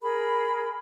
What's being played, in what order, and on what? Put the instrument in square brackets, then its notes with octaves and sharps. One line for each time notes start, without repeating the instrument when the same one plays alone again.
[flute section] G#4 A#4 B5